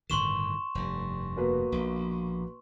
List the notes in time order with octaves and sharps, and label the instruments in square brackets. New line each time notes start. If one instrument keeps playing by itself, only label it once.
[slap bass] G1 A2 D#3 [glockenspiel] C6 C#6 E7
[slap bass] F1 G2
[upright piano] B2 A#3 B4
[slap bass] A#1